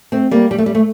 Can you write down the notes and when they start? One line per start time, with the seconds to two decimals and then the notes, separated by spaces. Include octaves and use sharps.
0.12 A3 C4
0.31 G3 A#3
0.51 G3
0.58 A3
0.66 G3
0.75 A3